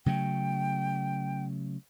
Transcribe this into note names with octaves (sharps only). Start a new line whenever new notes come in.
C#3 F#3 A3 G5